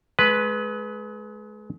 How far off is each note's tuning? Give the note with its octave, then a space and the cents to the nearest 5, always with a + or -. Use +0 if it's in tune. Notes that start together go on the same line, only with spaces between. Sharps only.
G#3 +35 B4 +0